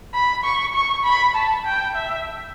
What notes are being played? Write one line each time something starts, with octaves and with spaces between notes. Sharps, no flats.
B5
C#6
C#6
B5
A5
G5
E5